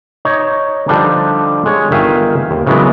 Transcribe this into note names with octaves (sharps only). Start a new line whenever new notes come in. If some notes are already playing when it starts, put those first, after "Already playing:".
D#4 C#5 D#5
D3 F3 G3 D4 D#4
G#3 C#5
G1 D#3 E5 F5 G5 G#5
D#2
C#3 E3 F#3 G#3 B3 A#4